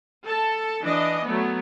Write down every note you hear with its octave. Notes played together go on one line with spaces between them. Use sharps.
A4 A5
E3 D4 D#5
F#3 A3 B3